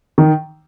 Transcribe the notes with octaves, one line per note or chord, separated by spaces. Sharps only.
D#3